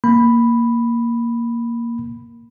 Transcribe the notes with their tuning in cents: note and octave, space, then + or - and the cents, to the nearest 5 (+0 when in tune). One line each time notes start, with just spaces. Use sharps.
A#3 +0 B5 +0